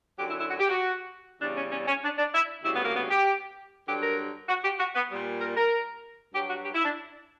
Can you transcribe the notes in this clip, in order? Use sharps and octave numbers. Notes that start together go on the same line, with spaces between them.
F#2 D3 F#3 G4
E4
E4
F#4
G4
F#4
E2 C#3 G3 D4
C#4
C#4
C#4
D4
D4
E4
D2 C#3 G3 E4
B3
A#3
B3
G4
G2 D3 F#3 G4
A#4
F#4
G4
F#4
B3
A#2 G3
A#4
A#4
G2 F#3 G4
F#4
G4
E4
D4